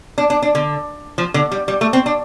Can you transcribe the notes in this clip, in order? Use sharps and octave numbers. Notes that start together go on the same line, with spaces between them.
D4
D4
D4
D3
F3
D3
G3
G3
A3
C4
D4